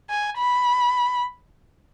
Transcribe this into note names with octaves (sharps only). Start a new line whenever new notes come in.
G#5
B5